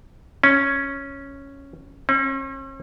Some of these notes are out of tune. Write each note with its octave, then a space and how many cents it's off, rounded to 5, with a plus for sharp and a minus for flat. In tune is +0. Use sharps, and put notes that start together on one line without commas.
C#4 -5
C#4 -45